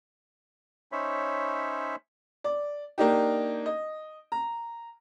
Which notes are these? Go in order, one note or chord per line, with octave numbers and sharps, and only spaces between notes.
C#4 D#4 C5 C#5 E5 B5
D5
A#3 D4 D#4 G4
D#5
A#5